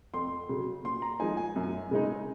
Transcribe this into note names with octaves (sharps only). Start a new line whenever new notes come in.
F2 C6
C#3 F#3
A#2 C6
A#5
F3 G#3 D#4 G#5
G#5
F#2
C#3 G#3 D#4